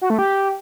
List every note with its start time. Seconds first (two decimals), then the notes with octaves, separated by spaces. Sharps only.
0.01 F#4
0.10 A3
0.19 G4